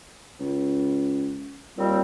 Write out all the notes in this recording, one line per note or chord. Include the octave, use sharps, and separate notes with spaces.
C#2
D#2 A#2 G3 C4